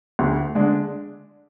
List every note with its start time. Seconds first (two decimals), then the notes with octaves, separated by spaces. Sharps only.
0.19 D2
0.55 D3 G#3 D4